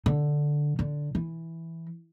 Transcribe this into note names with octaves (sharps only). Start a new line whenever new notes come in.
D3
D3
E3